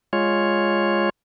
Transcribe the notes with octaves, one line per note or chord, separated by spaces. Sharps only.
G#3 F4 C#5